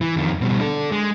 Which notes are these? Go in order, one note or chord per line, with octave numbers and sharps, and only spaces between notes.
E3
F2 D#3
B2 G3
D4 A4
G#3